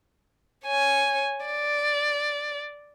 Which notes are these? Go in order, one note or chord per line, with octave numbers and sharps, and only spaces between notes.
C#5 G#5
D5